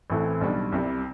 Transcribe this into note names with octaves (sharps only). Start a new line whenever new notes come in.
A1 A2 E3 A3 C4
B1 B2 G3 D4
C2 C3 G3